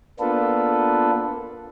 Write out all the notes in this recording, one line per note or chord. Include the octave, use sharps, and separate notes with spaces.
A#3 B3 D4 F4 A4 B4